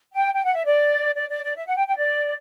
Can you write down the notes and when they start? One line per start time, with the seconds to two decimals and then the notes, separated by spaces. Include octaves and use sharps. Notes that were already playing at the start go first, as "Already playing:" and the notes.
0.13 G5
0.34 G5
0.44 F#5
0.54 E5
0.64 D5
1.15 D5
1.28 D5
1.43 D5
1.56 E5
1.66 F#5
1.76 G5
1.87 G5
1.97 D5